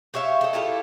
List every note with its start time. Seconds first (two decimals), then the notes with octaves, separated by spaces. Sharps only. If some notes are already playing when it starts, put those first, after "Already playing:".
0.14 G4 C#5 E5 F5
0.41 A4 D#5
0.53 E4 F4 G4 A4